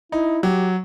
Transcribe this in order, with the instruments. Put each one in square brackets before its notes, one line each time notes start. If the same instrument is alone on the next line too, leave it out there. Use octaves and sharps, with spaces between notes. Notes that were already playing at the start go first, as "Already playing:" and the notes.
[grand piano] D#4 [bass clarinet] E4
[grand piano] F#3 [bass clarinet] G4